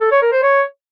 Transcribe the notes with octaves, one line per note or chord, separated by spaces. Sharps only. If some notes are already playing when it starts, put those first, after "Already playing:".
A4
C#5
A#4
C5
C#5